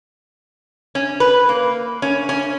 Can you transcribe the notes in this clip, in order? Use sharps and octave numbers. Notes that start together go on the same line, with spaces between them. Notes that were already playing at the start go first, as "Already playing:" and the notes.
C#4
B4
A#3
C#4
C#4